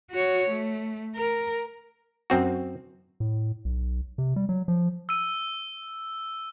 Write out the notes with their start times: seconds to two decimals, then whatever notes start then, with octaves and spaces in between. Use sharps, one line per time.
0.11 F#4 C#5
0.49 A3
1.16 A#4
2.30 F#2 C4 F#4
3.20 A2
3.65 B1
4.18 C3
4.36 G3
4.49 F#3
4.68 F3
5.09 E6 D#7